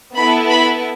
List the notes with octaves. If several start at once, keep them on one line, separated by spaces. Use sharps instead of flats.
B3 E4 A4 B5
B5